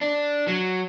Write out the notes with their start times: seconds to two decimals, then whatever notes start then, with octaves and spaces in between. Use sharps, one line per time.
0.01 D4
0.48 F#3